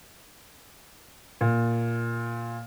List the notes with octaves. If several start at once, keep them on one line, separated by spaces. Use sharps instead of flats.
A#2